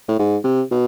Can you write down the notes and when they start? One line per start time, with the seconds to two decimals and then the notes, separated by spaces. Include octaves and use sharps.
0.08 A2
0.19 G#2
0.44 C3
0.71 B2